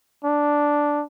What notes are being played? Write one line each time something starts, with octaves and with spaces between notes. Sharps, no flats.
D4